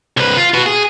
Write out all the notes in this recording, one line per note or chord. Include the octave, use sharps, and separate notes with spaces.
C2 B4
F4
F#4 B4
G#4